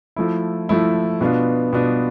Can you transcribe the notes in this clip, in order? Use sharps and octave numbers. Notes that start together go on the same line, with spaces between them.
F3 A3 E4
F3 A3 E4
B2 B3 D4 F4
B2 B3 D4 F4